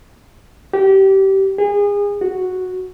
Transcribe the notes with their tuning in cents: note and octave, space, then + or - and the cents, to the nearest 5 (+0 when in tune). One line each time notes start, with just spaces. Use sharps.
G4 -25
G#4 -30
F#4 -5